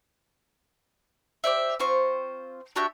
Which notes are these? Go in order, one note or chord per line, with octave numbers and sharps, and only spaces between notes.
G4 C5 D5 E5
C4 F4 C5 C#6
D4 F#4 G4 E5